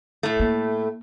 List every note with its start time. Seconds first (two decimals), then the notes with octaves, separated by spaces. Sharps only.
0.23 A2 A3
0.40 A#3